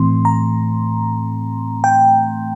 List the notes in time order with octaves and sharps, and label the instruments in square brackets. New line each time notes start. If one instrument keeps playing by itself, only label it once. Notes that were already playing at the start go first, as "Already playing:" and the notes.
Already playing: [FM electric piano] A2 E3 A3 C4 C6
A#5
G5